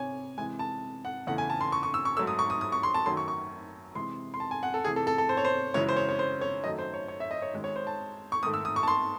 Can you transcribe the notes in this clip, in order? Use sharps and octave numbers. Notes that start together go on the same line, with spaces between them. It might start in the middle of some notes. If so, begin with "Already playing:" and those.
Already playing: C3 C#5 G#5
C3 E3 G#3 G#5
A5
F#5
E2 C#3 E3 A3 F#5
G#5
A5
C6
C#6
C#6
E6
C#6
G#2 F#3 A3 E6
D#6
C#6
D#6
D#6
C#6
C6
A5
F#2 D#3 F#3 A3 C6
C#6
C#6
C3 E3 G#3 C6
C6
A5
G#5
F#5
A4
C3 E3 A3 G#4
A4
A4
A4
C5
C#5
C5
F#2 C#3 E3 G#3 C#5
C5
C#5
C#5
C5
C#5
F#2 D#3 F#3 A3 D#5
C5
C#5
C#5
E5
D#5
C#5
F#2 D#3 G#3
C#5
C5
A5
C#6
G#2 D#3 A3 D#6
E6
D#6
C#6
A5
C6